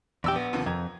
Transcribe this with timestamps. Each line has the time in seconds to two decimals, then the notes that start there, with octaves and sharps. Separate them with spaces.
0.24 A#1 E2 G4 E6
0.36 B3
0.53 D#2 C3 F3
0.66 F2 A#5 G#6